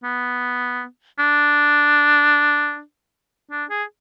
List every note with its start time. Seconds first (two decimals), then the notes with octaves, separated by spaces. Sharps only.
0.03 B3
1.19 D4
3.51 D4
3.70 G#4